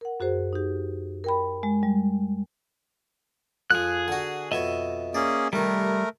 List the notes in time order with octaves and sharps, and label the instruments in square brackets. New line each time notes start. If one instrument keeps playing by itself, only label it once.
[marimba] A#4 F#5
F#2 F#4 G#4 C5
D#4 G4
A#4 G5 B5
G#3
G3
[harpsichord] F2 F3 [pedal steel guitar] G#4 F#6
[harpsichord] D3 F#4
[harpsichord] F2 B2 C#5 [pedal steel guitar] D#5 E5
[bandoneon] A#3 C#4 G#4 [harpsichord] D5
[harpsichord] C3 D#3 [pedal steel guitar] G3 [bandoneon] A3 A#4